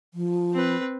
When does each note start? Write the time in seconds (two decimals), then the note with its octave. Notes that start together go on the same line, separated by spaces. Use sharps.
0.14 F3
0.53 C4 B4